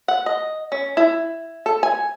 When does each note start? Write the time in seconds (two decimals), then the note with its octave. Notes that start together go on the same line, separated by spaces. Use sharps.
0.08 F#5
0.26 D#5
0.72 C#4
0.97 E4
1.66 A4
1.83 G#5